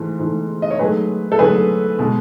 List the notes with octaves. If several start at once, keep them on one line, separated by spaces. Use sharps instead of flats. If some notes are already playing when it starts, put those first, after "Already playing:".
Already playing: G#2 E3 A3
G#2 E3 A3
D#5
C#5
G#2 F#3 A3 G#4 B4
A4
G#2 F#3 A3 G#4 B4
B2 G#3